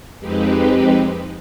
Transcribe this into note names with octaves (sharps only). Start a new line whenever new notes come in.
F2 G#3 C4 D#4 G4 B4